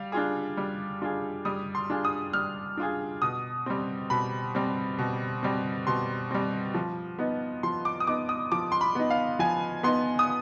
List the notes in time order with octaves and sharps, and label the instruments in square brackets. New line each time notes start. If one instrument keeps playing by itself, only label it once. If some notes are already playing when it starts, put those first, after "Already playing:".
Already playing: [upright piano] G3 [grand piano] F5
[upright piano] D4 F4 G#4
G3
D4 F4 G#4
[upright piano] G3 [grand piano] D#6
[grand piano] C6
[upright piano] D4 F4 G#4
[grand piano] D#6
[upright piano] G3 [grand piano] F6
[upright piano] D4 F4 G#4
[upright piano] B2 [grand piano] D#6
[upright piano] G3 C4
[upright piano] B2 [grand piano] B5
[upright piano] G3 C4
B2
G3 C4
[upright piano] B2 [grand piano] C6
[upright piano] G3 C4
F3
B3 D#4
[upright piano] F3 [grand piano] C6
[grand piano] D6
D#6
[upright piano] B3 D#4 [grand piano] D6
[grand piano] D#6
[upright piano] F3 [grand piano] D6
[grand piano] C6
B5
[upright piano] B3 D#4
[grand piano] F5
[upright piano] F3 [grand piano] G#5
[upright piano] B3 D#4 [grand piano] C6
[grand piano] D#6